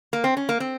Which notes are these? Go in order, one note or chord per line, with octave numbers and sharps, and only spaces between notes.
A#3
C4
C#4
A#3
C4